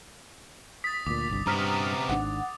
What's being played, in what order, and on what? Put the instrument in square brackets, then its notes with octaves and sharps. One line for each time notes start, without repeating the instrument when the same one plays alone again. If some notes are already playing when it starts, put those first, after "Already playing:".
[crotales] D#6 A6 [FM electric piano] B6
[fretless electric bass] D2 A#2 [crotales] D6
[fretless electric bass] G1 C2 G2
[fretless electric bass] G2 [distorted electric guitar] C3 B3 [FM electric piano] A#5 F6 B6
[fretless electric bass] G#1 G#2 D4 [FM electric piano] F#5